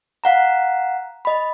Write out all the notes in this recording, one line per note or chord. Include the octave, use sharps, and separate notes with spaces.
F5 F#5 A#5
D#5 B5